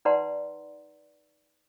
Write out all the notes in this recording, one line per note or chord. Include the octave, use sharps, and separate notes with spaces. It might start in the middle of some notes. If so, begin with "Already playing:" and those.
D#4 B4 D5 F#5 A#5 C6